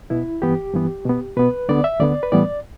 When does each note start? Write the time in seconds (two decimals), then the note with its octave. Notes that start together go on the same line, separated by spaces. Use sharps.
0.10 B2 B3 E4
0.42 G2 E3 B3 G4
0.73 G2 E3 B3
1.06 B2 B3
1.37 B2 B3 B4
1.68 D2 D3 B3 D5
1.84 E5
2.00 D2 D3 B3 D5
2.23 B4
2.32 A2 E3 G3 B3 D5